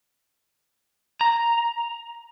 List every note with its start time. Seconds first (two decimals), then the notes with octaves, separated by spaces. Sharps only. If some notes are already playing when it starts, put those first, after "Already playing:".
1.21 A#5